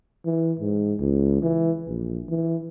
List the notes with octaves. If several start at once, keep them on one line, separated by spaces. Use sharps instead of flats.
E3
G#2
C#2
E3
A#1
E3